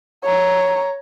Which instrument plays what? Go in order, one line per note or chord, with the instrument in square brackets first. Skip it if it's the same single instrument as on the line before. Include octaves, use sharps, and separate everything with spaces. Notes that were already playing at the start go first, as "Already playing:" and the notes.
[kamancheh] C#5 A#5